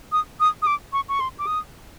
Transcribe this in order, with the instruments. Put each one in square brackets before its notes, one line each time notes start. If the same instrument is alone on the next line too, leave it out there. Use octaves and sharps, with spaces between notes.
[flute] D#6
D#6
D#6
D6
C#6
C#6
C6
D6
D#6